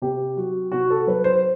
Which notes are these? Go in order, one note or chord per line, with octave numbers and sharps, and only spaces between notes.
C3 G4
F#3 F#4
C3 F#4
A4
F#3 B4
C5